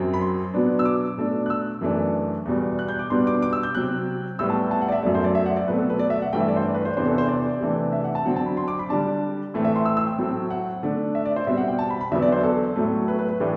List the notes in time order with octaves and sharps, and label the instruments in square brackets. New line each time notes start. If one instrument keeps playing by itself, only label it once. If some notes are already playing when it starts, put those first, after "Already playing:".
Already playing: [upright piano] F#2 F#3 C4
B5
C6
B2 F#3 B3 D4
E6
D6
B2 A3 D4
F#6
E6
F#2 E3 A3 D4
E2 B2 G3
F#6
G6
D6
B2 G3 B3 D4 C6
D6
D6
E6
G6
C3 F#3 C4 F#6
A2 G3 B3 E6
A5
A5
F#5
D5
E5
F#2 F#3 A3 D5
C5
D5
E5
F#5
D5
B2 F#3 A3 C4 B4
A4
B4
D5
E5
F#5
G2 E3 A3 G5
E5
D5
C5
D5
B4
C5
E2 C3 E3 B3 D4 C5
A4
C5
D5
C3 E3 A3 D4
E5
F#5
A5
D3 F#3 C4 F#5
A5
B5
C6
D6
B5
D3 G3 D4 A5
A2 E3 A3 C4
E5
C6
E6
E6
G5
A2 F#3 A3 C4
F#5
D3 A3 D4
E5
D5
C5
B2 G3 C4 E5
F#5
G5
A5
B5
B5
E2 D3 F#3 B3 D4 E5
D5
C5
A4
A2 F#3 A3
B4
B4
B4
A2 E3 A3 D4 G4